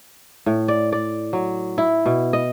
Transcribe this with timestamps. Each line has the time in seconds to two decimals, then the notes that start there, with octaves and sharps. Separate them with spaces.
0.46 A2
0.68 D5
0.93 D5
1.33 F#3
1.78 E4
2.06 B2
2.33 D#5